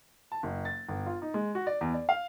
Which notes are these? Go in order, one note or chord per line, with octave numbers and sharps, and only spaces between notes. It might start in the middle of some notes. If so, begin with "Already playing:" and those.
A5
F#1
A6
G1
F4
D#4
G#3
F#4
D5
E2
D5
F5